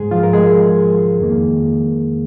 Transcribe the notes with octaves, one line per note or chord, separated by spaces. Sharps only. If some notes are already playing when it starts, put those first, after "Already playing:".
Already playing: G#2 G#3 G#4
F3 F4
A#4
G#3 G#4
F2 D#3 A#3